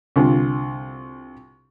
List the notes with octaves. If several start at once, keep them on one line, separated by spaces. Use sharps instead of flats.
C2 D3 F4